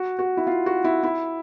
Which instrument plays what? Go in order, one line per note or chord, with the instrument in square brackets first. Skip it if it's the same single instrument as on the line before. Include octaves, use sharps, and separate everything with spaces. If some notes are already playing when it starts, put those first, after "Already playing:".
Already playing: [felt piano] F#4
F#4
E4
F4
F#4
E4
E4